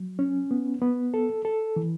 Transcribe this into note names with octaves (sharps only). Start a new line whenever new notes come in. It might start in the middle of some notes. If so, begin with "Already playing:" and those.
Already playing: F#3
C#4
B3
B3
A4
A4
E3